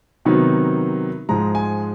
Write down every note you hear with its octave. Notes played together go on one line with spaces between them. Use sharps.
C3 D#3 F#3 B3 D#4
G#2 F3 G#3 A#5
G#5